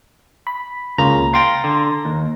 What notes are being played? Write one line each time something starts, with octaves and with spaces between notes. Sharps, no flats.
B5
C#2 C#3 A#3 F4 A#5
F5 G5 C6 A6 A#6
D3
D#2